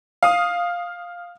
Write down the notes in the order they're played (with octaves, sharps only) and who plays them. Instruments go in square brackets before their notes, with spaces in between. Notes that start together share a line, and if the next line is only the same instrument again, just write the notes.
[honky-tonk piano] F5 D#6